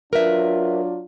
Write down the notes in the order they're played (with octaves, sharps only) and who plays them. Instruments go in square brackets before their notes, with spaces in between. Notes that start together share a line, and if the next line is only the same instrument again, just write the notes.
[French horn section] F#3 D4 F4 [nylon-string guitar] A#4 B4 E5